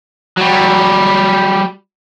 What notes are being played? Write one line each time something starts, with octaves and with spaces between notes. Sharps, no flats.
F#3 G3